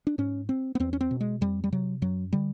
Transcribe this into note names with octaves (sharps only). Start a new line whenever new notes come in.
D4
G#2 C#4
C4
B3
E2 C4
C#4
C4
B2
G#3
F2 G3
G3
C3 F#3
F#2 F#3
D3 G3